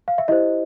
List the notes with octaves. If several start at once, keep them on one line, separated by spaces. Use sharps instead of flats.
F5
E5
E4 G4 C5 D#5